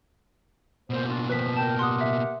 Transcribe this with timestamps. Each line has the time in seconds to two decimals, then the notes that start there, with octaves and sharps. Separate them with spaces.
0.90 B2 A#3 C5
1.07 D4 F4 F#4
1.30 D#3 F3 B4 B6
1.57 A#4 G5 A5
1.79 G4 A#4 F#5 C6 D#6
2.01 E5